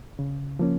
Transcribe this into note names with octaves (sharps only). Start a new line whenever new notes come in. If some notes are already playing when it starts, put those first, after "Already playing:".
C#3
F3 A#3 C#4